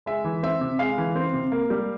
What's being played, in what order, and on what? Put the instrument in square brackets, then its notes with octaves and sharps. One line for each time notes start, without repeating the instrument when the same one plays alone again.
[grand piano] G#3 E5
E3
C4 E5
C3
G#3 F5
E3
C4
C3
A#3
G3